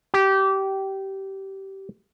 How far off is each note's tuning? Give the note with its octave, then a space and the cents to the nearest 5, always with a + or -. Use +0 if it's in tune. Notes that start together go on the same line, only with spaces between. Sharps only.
G4 -20